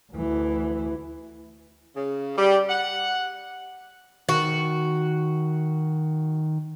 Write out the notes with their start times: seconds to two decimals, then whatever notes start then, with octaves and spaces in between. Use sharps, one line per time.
0.12 D2 E3
1.94 C#3
2.35 G3
2.69 F#5
4.29 D#3 F#4